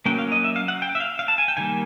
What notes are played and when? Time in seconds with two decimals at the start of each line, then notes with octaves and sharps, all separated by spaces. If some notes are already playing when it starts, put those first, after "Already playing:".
0.06 F#3 A#3 C#4 G5
0.18 F5
0.32 D#5
0.44 E5
0.56 F5
0.68 F#5
0.82 G5
0.95 E5
1.00 F5
1.19 F5
1.28 A5
1.38 G#5
1.48 G5
1.57 D#3 G3 A#3 G#5